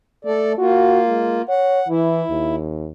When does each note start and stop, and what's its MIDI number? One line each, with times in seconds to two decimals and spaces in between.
0.25 0.55 57
0.25 0.53 69
0.25 0.53 74
0.58 1.42 58
0.58 1.42 65
0.58 0.99 66
1.07 1.38 56
1.49 1.81 73
1.49 1.88 78
1.88 2.22 52
1.88 2.56 64
2.30 2.92 39